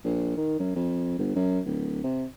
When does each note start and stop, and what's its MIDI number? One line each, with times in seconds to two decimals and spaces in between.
0.05 0.34 34
0.37 0.59 51
0.59 0.73 42
0.76 1.15 41
1.18 1.32 31
1.36 1.60 42
1.66 2.02 26
2.04 2.25 48